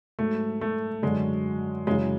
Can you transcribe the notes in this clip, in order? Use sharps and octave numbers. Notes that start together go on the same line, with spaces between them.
G#2 F#3 A3
A3
F#2 D3 F#3 G#3
F#2 C#3 E3 G#3